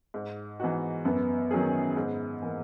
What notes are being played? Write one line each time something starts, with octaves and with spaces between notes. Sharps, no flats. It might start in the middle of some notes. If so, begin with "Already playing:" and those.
G#2
E3 B3 D#4 F#4
F#2 B3
D#3 F#3 C#4 G#4
G#2
E3 A#3